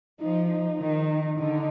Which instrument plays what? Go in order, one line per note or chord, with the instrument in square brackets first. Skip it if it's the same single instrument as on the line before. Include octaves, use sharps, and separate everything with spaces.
[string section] F3 [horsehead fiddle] D#4
[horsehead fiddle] D#4
[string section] D#3
[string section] D3 [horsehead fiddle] D#4